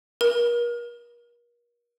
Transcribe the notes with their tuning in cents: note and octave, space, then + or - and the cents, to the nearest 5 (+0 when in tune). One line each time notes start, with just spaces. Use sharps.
A#4 +40